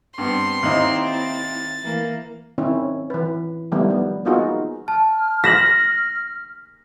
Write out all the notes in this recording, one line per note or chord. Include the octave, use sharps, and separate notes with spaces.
G2 B3 C4 C6
D#2 C4 D#4 E4
A6
E3 A#3
D#3 C4 C#4 E4
E3 B4
D#3 F3 G3 A3 B3 E4
B3
A#3 B3 D#4 F4 F#4 G#4
A5 F6
A#6 B6 E7 F#7